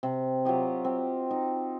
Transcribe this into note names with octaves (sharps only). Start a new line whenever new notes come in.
C3
F#3 F4 G4 D#5
C4
D#4